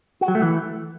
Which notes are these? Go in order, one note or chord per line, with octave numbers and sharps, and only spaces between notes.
F#4
F#3
A3
E3